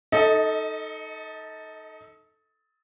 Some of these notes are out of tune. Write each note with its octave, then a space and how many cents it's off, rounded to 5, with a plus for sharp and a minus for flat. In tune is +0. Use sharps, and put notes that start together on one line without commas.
D#4 +0 A4 +0 D#5 +30